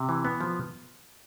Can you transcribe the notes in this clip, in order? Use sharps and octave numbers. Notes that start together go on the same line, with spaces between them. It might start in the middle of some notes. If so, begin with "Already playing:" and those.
Already playing: C3
E3
B3
F3